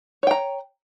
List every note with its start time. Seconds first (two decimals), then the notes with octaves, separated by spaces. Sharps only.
0.23 C#5
0.27 G5
0.31 A#5